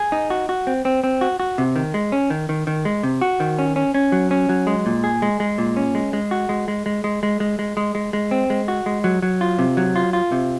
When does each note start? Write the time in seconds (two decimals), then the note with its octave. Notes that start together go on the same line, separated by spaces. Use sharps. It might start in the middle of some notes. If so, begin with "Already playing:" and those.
Already playing: G#4
0.12 D#4
0.30 F#4
0.49 F#4
0.67 C4
0.85 C4
1.04 C4
1.21 F#4
1.40 F#4
1.58 C3
1.76 D#3
1.94 G#3
2.12 C#4
2.30 D#3
2.49 D#3
2.67 D#3
2.85 G#3
3.03 C3
3.22 F#4
3.40 D#3
3.59 C#4
3.76 C#4
3.94 C#4
4.12 F#3
4.31 C#4
4.49 F#3
4.67 G#3
4.86 A#2
5.04 G#4
5.22 G#3
5.40 G#3
5.58 A#2
5.77 C#4
5.95 G#3
6.13 G#3
6.31 F#4
6.49 G#3
6.68 G#3
6.86 G#3
7.04 G#3
7.23 G#3
7.40 G#3
7.59 G#3
7.77 G#3
7.95 G#3
8.13 G#3
8.31 C4
8.50 G#3
8.68 F#4
8.86 G#3
9.04 F#3
9.22 F#3
9.41 F4
9.59 C3
9.77 F#3
9.96 F4
10.13 F4
10.32 C3